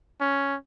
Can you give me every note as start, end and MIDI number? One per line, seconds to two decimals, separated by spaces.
0.21 0.56 61